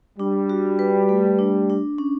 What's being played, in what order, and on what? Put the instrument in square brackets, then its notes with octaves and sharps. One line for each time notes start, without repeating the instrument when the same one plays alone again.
[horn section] G3 [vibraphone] D4
[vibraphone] F#4
B4
A3
D4
D4
C#4